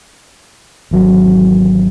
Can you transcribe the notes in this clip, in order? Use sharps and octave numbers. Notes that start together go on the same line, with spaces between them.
G#1 E2 F#3